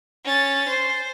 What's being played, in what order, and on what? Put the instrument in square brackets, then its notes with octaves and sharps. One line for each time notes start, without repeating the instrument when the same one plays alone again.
[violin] C#4 A6
C5